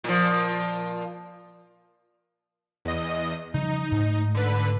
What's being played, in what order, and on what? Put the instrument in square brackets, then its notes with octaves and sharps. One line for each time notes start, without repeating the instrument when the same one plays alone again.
[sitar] A#2 F3
[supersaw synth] E2 D#5
[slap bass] C#3 F3 G3 [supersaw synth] D#4
[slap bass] G#2 A3
[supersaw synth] D3 B4